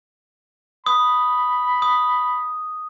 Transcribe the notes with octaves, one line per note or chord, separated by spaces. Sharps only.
B5 D#6
D#6